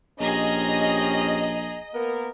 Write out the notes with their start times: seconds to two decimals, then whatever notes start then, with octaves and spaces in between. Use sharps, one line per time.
0.20 A#1 C#4 G4 G#4 D#5 A#5
1.94 A#3 B3 A#4